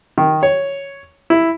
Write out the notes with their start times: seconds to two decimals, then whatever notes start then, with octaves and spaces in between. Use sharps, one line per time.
0.18 D#3
0.43 C#5
1.30 E4